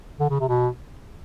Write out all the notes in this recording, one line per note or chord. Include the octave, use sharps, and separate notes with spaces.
D3
C#3
C3
B2